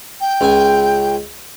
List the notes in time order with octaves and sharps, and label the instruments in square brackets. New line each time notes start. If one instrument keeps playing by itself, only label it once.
[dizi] G5
[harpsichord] C#2 G#5